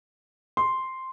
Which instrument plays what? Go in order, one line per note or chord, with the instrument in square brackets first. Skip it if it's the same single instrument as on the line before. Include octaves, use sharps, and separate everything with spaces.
[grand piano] C6